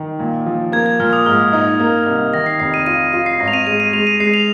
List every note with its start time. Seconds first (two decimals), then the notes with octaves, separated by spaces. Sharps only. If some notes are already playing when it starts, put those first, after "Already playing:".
Already playing: D#3
0.19 A#2
0.46 F3
0.72 A#3 G#6
0.86 G#6
1.00 A#2 F6
1.13 D#6
1.26 G#2 F6
1.53 D#4
1.79 A#3
2.06 C2
2.33 D#3 A#6
2.46 C7
2.60 F1 C7
2.74 D#7
2.86 F4 D#7
3.13 F4 D#7
3.26 C7
3.40 G#1 A#6
3.48 F7
3.53 D#7
3.66 G#3 D#7
3.80 D#7
3.93 G#3 F7
4.07 D#7
4.20 G#3 C7
4.34 F7